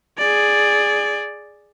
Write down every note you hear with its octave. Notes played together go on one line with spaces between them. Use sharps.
G#4 D5